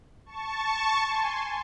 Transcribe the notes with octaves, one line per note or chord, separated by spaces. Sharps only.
A5 C#6
G#5 C6